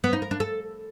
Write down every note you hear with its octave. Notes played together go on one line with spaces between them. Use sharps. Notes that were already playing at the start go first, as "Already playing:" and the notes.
B3
D#4
A#4
D4
A4